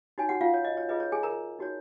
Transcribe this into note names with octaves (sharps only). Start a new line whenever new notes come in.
D#4 F#4 C#5 G#5
F#4 F#5
F4 F5
C#5
D#5
C#5
F4 G#4 B4 D#5
C#5
G#4 G#5
A#4 A#5
D#4 F#4 C#5